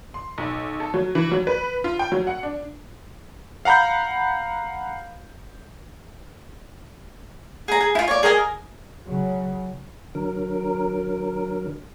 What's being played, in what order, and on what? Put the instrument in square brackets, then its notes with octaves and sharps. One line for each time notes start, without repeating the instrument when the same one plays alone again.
[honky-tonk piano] C6
B1
A4
F#3
E3
F#3
B4
F4
G5
F#3
F#5
D4
[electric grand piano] F5 F#5 A#5 B5 G6
[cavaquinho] G#4 A#5
G#4
E4 F4
C#5 D5
G#4 A#4 D#5 G#5
[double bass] C#3 F#3
[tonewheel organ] D3 F#3 A#4